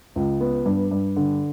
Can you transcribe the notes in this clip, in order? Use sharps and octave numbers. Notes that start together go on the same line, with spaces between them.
C#2
B3
G2
G2
D3